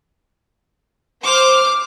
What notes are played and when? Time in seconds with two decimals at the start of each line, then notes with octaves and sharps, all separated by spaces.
1.24 C5 D6 F6